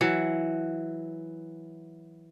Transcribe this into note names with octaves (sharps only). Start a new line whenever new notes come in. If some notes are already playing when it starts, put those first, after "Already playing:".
E3 F#3